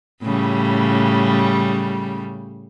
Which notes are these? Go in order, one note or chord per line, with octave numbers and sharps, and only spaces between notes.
A2 C#3 G3